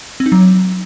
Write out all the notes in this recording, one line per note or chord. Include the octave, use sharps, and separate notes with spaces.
C4
D#4
F#3